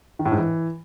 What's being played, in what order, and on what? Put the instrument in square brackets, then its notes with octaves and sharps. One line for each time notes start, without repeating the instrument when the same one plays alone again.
[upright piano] D#3
A2
G#2
E3